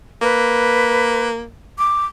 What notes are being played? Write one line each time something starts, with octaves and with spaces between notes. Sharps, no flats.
A#3 B4
D6